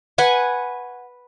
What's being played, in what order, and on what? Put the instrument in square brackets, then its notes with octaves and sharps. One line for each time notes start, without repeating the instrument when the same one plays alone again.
[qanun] B4 F#5 G#5 C#6